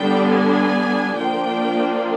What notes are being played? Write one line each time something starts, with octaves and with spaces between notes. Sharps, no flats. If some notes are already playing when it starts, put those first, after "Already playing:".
Already playing: D3 G3 B3 D4 G5
G#5
F3 A#3 D4 G5